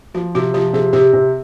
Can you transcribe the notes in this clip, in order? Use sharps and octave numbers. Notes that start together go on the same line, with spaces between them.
F3 F#4
C3 F#4
F3 G4
C3 G#4
C3 G4
C3